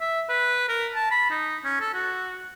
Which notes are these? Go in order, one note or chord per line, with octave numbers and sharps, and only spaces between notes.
E5
B4
A#4
A5
B5
D#4
C#4
A4
F#4